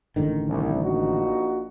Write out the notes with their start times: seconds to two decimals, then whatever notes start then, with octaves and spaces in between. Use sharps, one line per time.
0.16 A1 D3 D#3
0.47 C2
0.82 A#1 D#4 F#4